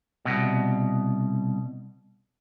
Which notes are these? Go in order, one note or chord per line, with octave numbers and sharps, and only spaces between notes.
C2 B2